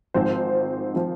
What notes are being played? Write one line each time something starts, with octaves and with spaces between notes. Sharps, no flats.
G#1 G#2 F3 C4 C5
F3 C4